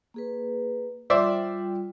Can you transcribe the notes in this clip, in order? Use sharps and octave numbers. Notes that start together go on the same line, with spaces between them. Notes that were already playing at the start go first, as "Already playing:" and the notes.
A#3 G#4 B4
G3 F4 C5 D5 E5 G5